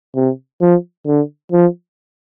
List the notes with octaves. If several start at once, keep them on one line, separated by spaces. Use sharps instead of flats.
C3
F3
D3
F3